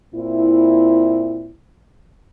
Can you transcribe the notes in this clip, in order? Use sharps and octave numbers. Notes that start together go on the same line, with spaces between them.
A#2 C4 E4